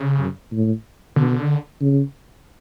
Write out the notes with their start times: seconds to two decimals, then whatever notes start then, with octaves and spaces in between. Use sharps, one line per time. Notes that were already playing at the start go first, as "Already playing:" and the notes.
Already playing: C#3
0.19 F#2
0.52 A2
1.16 B2 D3
1.81 C#3